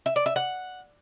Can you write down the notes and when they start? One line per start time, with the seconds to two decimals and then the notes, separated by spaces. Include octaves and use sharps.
0.06 E5
0.16 D5
0.26 E5
0.36 F#5